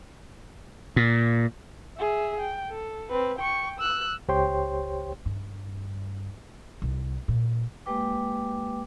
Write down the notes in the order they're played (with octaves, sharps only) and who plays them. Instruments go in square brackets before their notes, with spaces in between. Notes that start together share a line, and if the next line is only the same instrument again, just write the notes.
[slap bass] A#2
[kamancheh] G#4 E5
G5
A4
C4 B4
G5 C#6
E6 F#6
[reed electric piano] C#2 G4 C5 C#5 G5 C6
[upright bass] G2
C2
A#2
[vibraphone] G#3 A#3 G4 B4 G5 D6